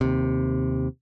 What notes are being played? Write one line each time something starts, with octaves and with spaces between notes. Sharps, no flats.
D#2 C3